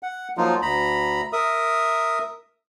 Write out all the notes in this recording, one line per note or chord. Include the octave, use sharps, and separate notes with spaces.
F#5
F3 F#3 A#3 D#4 F4
D2 A#5 B5
A#4 E5 D#6